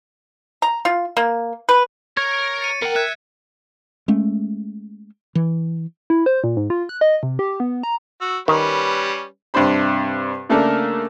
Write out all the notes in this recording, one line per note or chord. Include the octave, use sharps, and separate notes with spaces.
A#5
F4
A#3
B4
A#4 C#5
A6 C#7 D#7
E2 A#4 F#5 G5
E5 F#6 G#6
G#3 A3 C#4
E3
E4
C5
A#2
G#2
F4
F#6
D#5
C3
G4
B3
A#5
F#4 E6
D#3 G3 C#4 B4
G2 C3 D4 C5 B5
C#3 A3 A#3 D4 A4 A#4